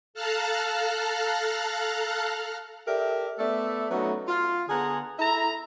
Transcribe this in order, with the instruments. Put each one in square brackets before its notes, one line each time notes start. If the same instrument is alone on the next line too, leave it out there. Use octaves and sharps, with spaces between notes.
[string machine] A4 F5 A5 A#5 F6 F#6
[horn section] G4 A4 A#4 D5 E5
A3 B3 A4 D5 E5
F#3 A3 B3 C#4 D#4 F#4
F4
D3 B3 G#4 F#5 G#5 A#5
E4 A4 E5 A#5